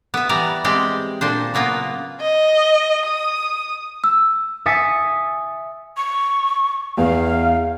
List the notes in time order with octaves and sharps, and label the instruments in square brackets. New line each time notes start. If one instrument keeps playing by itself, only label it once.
[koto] B3 E5
E3 G3 B3 D5 A#5
G#3 C4 G4 D5
A#2 D4 C5
C#3 F#3 A#3 B3 F4
[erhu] D#5
D#6
[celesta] E6
[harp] E5 G#5 D#6 A6 B6 C#7
[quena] C#6
[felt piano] E2 [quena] F5